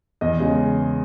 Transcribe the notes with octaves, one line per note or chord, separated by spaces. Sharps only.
E2 D#5
C#3 G#3